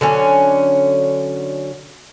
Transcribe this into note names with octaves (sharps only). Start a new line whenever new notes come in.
D3 F#3 C#4